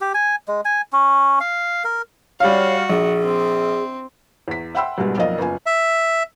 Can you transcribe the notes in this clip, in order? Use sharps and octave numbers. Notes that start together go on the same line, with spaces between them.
G4
G#5
G#3
G#5
C#4
F5
A#4
G3 F#4 C#5 F5
A#1 G#4
C4
E2 B6
E5 F#5 G5 B5 C6 E6
C2 G2 B2 G3 G#3
B1 F2 A#3 D5 D#5 F5
F#1 B3 F4 G#5
E5